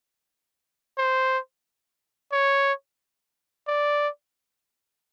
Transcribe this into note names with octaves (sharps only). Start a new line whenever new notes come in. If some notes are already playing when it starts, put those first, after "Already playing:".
C5
C#5
D5